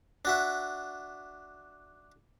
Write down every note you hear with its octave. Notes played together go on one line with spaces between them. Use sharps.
D4 F#4 E5